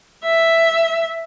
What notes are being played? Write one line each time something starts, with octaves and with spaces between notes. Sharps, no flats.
E5